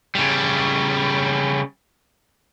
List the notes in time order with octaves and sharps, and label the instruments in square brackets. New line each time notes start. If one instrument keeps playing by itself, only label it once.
[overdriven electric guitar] C#3 G3